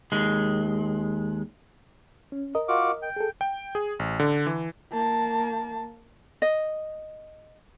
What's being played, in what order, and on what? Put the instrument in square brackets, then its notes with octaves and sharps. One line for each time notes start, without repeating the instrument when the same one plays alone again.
[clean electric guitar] D#2 G#3
[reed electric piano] C#4
A#4 D#5
[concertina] F4 F#4 D6
G5
[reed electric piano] G#4 A4
[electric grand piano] G5
G#4
A1
D3
E3
[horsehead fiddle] A#3 A5
[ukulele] D#5